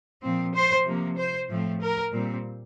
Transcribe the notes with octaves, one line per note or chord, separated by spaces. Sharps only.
A#2 F3 C4
C5
C3 F3 A#3
C5
A2 F3 A3 C4
A#4
A#2 G3 C4